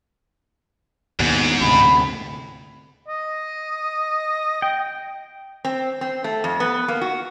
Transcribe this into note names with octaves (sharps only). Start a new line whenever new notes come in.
D#2 G#2 B2
D2 C3 B5
D#5
G5
C4
C4
A3
F2
B3
A#3
F#4